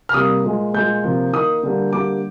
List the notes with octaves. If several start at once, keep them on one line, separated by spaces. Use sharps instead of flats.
F6
C3 G3 A#3 D#6
A#2 G#3
A#2 G#3 G6
C3 F3 A#3
D#3 A#3 D#6
D3 G3 A#3
D3 G3 A#3 D6